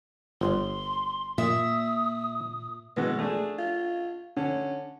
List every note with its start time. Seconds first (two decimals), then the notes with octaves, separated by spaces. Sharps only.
0.41 G1 C6
1.38 A#2 E5 D#6
2.97 B2 E3 G#3 B3
3.19 A3 D4 G#4
3.59 F4
4.37 D3 C#4